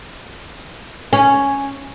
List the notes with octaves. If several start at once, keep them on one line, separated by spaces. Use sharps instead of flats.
C#4